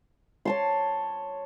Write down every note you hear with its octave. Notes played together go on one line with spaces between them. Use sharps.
C#5 A5 C6